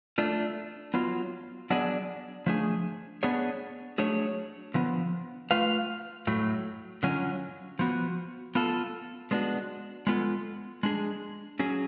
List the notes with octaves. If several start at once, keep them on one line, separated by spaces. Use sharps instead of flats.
A3 D4 F4
F#3 B3 F4
F#3 B3 D4 G#4 D5
F3 A3 D4 G#4
B3 D4 G#4 C#5
F#3 A3 D4 G#4 C#5
D3 F3 B3
A3 F4 B4 F5
A2 F#3 A3
D3 F#3 C#4 F4
F3 B3 F#4
B3 F4 A4
G#3 B3 D4 F#4
G#3 B3 F4 A4
G#3 D4 G#4
F#3 C#4 G#4